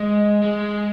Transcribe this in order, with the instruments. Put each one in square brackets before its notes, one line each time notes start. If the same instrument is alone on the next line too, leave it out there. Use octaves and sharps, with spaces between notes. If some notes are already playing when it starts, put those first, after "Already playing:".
Already playing: [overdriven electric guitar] G#3 [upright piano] D#5
[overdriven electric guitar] G#3